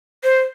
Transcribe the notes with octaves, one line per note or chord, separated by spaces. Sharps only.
C5